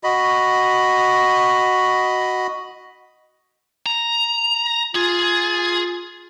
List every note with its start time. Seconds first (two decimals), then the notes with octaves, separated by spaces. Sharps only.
0.04 F#4 D#5 B5
3.86 A#5
4.95 F4 G#4